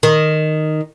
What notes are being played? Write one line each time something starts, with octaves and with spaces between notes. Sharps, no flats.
D#3